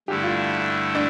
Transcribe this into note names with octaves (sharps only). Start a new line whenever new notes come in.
G2 D3 A3 E4 G4
F4
D4